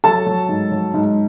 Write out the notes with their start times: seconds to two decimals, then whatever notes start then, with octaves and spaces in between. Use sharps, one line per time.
0.04 F#3 A4 A5
0.26 F#3
0.49 G#2
0.71 F#3
0.94 G#2